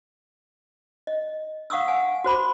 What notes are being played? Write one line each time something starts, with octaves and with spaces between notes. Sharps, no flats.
D#5
F5 F#5 C#6 D#6 E6
F#5 G#5
F#4 C5 B5 D6